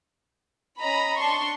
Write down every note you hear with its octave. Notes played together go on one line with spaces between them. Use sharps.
C#4 D#5 A#5 B5
D4 A5 C6 C#6